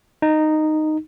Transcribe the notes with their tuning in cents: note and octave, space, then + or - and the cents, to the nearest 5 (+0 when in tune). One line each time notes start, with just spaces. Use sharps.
D#4 -10